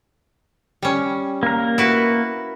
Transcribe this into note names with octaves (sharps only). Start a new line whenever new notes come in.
G3 C#4
A#3 A#4
E4 F#4 B4